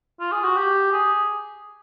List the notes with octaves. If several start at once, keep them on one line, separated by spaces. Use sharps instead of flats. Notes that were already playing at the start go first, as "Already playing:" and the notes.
F4
G#4
F#4
G4
G#4